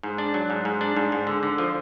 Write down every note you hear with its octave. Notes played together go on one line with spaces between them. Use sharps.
G#2
D4
F#3
G#2
G#2
D4
G#2
G#2
D3
D3
F3